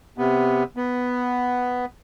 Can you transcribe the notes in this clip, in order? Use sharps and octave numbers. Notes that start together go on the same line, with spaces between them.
C3 B3
B3